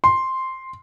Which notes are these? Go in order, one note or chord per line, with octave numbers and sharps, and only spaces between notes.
C6